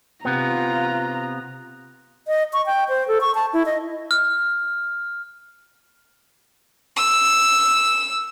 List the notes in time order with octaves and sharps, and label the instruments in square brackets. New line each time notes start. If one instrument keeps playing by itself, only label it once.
[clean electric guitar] C3 B3 [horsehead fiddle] F4 A#5
[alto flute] D#5
C#6
G5
C5
A4
C#6
A5
E4
D#5
[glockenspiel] F6
[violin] E6